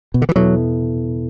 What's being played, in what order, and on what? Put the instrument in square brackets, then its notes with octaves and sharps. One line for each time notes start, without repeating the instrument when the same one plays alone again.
[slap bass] B2
D3
E3
[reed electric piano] E2 B2 B3 E4 A4 [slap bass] F#3